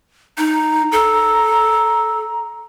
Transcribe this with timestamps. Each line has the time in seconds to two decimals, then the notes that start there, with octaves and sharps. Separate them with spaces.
0.38 D#4 A#5
0.92 A4